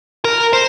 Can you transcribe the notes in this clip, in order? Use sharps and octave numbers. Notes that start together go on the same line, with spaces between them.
A#4
C5